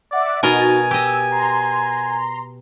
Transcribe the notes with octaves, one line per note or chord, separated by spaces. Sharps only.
D5 E5 F#5 D6
B2 D#4 F#4 A#4 D#5 G#5 A6
G4 D#5 E6
A#5 C6